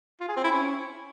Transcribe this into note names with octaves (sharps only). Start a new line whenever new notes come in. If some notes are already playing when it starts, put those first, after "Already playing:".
F4
G#4
C4
E4
C#4